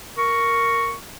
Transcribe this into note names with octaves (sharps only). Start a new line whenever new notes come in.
A#4 C#6